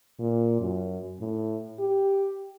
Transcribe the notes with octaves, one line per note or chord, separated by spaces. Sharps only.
A#2
F#2
A2
G4